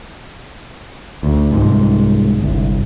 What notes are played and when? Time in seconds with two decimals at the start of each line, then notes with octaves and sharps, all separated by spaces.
1.23 D2
1.51 C2 G#2
2.40 G1 C2